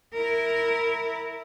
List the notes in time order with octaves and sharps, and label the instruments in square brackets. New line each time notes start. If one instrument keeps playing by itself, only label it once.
[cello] E4 A#4